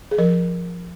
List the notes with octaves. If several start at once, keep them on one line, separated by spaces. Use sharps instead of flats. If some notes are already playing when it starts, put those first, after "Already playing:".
G#4
F3 A#4